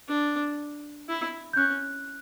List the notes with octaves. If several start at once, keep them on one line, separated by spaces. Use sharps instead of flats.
D4
E4
G6
C#4 F#6